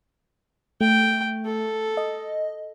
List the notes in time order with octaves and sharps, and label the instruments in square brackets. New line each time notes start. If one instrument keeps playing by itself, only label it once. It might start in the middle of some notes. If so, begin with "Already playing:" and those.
[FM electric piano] A3 [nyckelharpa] G5
[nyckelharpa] A4
[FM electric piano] D#5